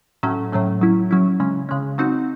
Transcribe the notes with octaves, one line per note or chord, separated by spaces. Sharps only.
A2 F#3 A3 C#4
A2 F#3 A3 C#4
F#3 C#4 E4
F#3 C#4 E4
C#3 G#3 C#4
C#3 G#3 C#4
F#3 C4 D#4 F#4